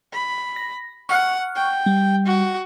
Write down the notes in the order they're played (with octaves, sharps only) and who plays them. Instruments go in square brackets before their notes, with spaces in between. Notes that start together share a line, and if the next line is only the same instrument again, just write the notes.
[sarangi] B5
[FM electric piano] A#6
[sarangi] F#5 [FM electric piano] C#6 F6 F#6
[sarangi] G5
[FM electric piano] G3
[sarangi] F#4